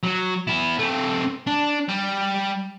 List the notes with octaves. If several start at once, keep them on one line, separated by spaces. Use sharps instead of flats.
F#3 F#4
B3 E4
A3 C4
D4
G3